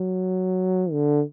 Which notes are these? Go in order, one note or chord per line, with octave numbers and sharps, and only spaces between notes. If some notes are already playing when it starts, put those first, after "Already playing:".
Already playing: F#3
D3